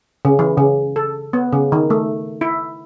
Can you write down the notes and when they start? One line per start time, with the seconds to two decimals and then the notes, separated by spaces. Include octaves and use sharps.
0.25 C#3
0.39 E3
0.57 C#3
0.96 A4
1.33 B3
1.53 C#3
1.72 D#3
1.90 A3
2.41 E4